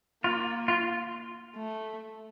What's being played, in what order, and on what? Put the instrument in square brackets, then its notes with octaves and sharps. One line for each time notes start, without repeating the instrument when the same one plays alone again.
[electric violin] A#3 [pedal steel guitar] F4
[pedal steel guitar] F4
[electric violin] A3